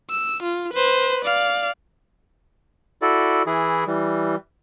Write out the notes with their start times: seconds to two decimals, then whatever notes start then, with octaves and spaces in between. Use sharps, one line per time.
0.10 E6
0.43 F4
0.74 B4 C5
1.25 D5 F5
3.02 E4 F#4 A4 D5
3.46 E3 E4 G#4
3.87 E3 G3